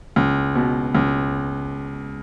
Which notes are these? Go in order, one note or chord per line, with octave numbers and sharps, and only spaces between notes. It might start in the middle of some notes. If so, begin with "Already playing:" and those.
C#2
B2
C#2